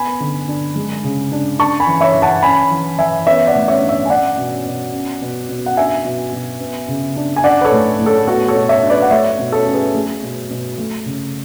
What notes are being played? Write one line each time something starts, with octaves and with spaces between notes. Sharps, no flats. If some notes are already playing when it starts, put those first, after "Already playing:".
Already playing: B3 G#5 B5
D3
D4
G#3
C#3
D4
D4 A5 C#6
G#5 B5
E3
C#5 E5
E3
F#5 A5
C#4 G#5 B5
E3
E3 E5 G#5
B3 C#5 E5
D5 F#5
A2
C#5 E5
D4
C#5 E5
G#5
C#4 D5 F#5
B2
B2
C#4
B2
B2
F#5
D4 E5 G#5
B2
B2
B3
C#3
D4
G#5
D4 D5 F#5
B4
A4 C#5
A2
A2
A4 C#5
B3 F#4 A4
A4 C#5
B2
C#5 E5
D4
B4 D5
F#5
A3 C#5 E5
B2
A4 C#5
C#4
G#4 B4
A3 G#4
B2
B2
A3
C#3